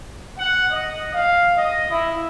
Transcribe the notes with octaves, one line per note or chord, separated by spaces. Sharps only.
F#5
D#5
F5
D#5
E4